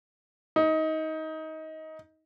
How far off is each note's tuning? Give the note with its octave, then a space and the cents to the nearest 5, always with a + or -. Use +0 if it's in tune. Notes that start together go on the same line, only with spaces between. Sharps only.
D#4 +20